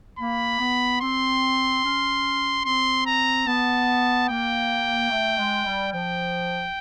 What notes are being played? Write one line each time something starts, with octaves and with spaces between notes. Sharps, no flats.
A#3 B5
B3
C4 C6
C#4
C4 C6
A#5
B3 A5
A#3 G5
A3
G#3
G3
F3 G5